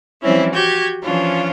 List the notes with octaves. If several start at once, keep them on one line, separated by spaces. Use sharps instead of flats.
E3 F3 G3 C4 C#4 E4
F#4 G4 G6 G#6
E3 F3 C#4 D4 F4